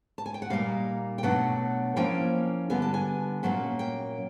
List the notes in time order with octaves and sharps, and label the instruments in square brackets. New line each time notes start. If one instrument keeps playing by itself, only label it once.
[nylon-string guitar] A5
G#5
G5
F#5
A#2 G3 A#3 D#4 F5
G5
B2 F#3 A3 D4 F#5
F3 A#3 C#4 E4 G5
D3 G3 B3 G#5
A5
G#5
A#2 F#3 A#3 C#4
G5